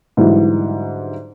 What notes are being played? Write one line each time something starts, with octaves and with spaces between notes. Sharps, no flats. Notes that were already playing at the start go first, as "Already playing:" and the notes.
G#2 D3 E3 F#3 G3 E4